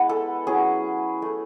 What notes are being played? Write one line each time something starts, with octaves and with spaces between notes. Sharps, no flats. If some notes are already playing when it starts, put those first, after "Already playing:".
Already playing: G#3 B3 E4 B4
A4
F#3 C#4 E4 G#4
A3 E4